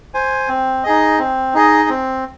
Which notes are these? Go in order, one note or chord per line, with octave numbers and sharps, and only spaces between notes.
C5 G#5
C4
D#4 G#4 D#5
C4
D#4 G#4 D#5
C4